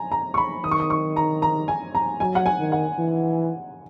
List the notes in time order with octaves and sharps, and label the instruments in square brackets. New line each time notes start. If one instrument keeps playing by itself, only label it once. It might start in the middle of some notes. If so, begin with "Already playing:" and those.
Already playing: [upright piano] G#5 A#5
A#5
C#6
B5
[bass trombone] D#3 [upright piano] D#6
[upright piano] C#6
D#6
C#6
A#5
A#5
G#5
A#5
[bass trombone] F#3 [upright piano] G#5
[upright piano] F#5
G#5
[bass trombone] D#3
[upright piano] F#5
[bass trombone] E3